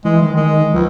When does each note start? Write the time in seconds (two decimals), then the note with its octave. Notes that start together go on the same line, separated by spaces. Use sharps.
0.05 E3 G#3
0.22 D#3 G#3
0.37 G#3
0.74 C#2 F3